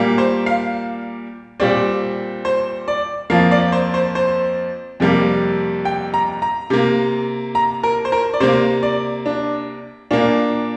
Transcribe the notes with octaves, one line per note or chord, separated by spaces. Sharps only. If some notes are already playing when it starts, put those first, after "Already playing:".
Already playing: A#2 G3 A#3
C5
F5
A#2 G3 C4 D5
C5
D5
F2 F3 A#3 F5
D5
C5
C5
C5
F2 C3 G3 A#3
G5
A#5
A#5
C3 A#3
A#5
A#4
C5
A#4
D5
C3 A#3 C5
D5
D4
A#2 A#3 D4